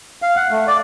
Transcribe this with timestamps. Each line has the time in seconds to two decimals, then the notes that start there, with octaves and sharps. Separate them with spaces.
0.22 F5
0.36 F#5
0.51 A3
0.67 D5